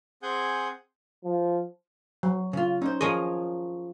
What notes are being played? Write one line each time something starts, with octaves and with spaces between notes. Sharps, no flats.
C4 G#4 F#5 G#5 G6
F3
F#3
C#3 F4
C#4 D#4 C5
F3 G#4 A#4 C#5 D#5